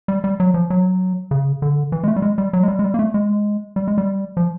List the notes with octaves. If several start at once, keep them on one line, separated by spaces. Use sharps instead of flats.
G3
G3
F#3
F3
F#3
C#3
D3
E3
G#3
A3
G3
G#3
G3
F#3
G#3
G3
G#3
G3
A#3
A3
G#3
G3
G#3
G3
F3